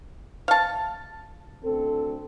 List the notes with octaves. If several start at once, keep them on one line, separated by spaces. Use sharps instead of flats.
F5 A5
D2 C4 A4